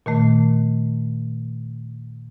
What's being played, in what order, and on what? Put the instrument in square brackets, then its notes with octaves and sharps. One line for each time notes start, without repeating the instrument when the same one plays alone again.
[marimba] A#2 D#3 A3